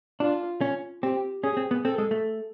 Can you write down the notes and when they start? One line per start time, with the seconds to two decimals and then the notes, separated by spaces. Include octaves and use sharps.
0.20 D4 F4
0.61 C#4
1.02 C4 G4
1.43 C#4 G#4
1.57 C4
1.71 B3
1.85 C4 A4
1.98 G#3
2.11 A3